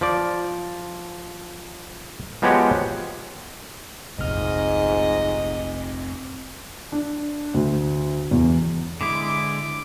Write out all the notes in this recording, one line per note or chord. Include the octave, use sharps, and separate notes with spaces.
F3 D5
F3 G#3 B3 F#4 G4 C#5
F1 A#1 F2 G#2 D#5 F6
D4
D2
E2
D3 G#3 E4 D6